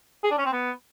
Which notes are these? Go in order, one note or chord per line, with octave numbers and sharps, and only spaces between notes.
G#4
D4
C#4
C4
B3